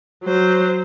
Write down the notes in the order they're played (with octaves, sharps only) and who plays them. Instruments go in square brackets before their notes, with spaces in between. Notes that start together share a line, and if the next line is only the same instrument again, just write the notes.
[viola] F#3 C5